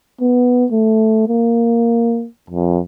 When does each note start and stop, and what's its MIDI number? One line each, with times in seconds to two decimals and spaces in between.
0.21 0.65 59
0.72 1.28 57
1.28 2.26 58
2.50 2.80 41